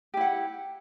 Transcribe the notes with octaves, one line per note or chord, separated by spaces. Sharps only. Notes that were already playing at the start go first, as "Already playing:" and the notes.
E4 G4 F#5